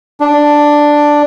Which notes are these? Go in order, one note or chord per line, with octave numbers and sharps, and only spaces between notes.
D4